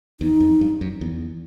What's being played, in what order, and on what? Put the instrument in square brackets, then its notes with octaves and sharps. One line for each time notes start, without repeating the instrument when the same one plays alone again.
[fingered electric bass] E2 [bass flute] D#4
[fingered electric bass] F2
G2
F#2
E2